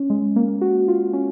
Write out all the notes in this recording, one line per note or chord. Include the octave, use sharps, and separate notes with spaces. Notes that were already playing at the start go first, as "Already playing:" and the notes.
Already playing: C#4
G#3
A#3
F#4
F4
C#4